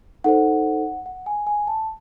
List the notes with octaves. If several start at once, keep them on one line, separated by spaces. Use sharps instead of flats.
D#4 A4 C5 F#5
F#5
G#5
G#5
A5